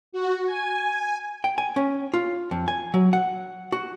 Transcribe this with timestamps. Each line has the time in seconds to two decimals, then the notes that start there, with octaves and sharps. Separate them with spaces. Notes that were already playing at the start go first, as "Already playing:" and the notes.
0.12 F#4
0.46 G#5
1.44 G5
1.58 G#5
1.76 C#4
2.14 F4
2.51 F2
2.68 G#5
2.94 F#3
3.13 F#5
3.72 F#4